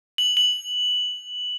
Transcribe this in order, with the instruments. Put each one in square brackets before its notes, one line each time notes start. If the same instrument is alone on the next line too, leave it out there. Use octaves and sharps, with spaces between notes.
[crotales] F#7
F#7